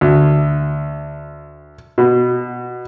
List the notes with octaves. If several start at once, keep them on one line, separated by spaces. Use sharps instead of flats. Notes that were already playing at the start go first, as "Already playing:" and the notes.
D2
B2